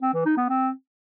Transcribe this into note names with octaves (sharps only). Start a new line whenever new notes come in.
C4
E3
D#4
B3
C4